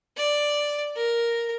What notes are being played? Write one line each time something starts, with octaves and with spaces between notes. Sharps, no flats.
D5
A#4